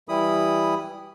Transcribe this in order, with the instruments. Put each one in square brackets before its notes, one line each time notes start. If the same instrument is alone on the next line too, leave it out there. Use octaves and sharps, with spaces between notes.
[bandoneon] E3 G3 E4 B5 D#6